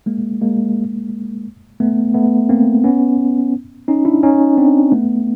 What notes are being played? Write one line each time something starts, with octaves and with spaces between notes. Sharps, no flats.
G#3 A#3
G#3 A#3
A3 B3
A3 B3
A#3 C4
B3 C#4
C#4 D#4
D4 E4
C#4 D#4
C4 D4
A3 B3